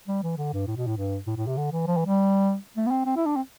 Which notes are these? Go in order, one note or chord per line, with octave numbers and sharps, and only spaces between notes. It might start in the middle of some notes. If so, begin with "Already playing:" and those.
G3
E3
D3
G2
A2
B2
A2
G2
A2
A2
C3
D3
E3
F3
E3
G3
A3
B3
C4
C4
E4
D4
C4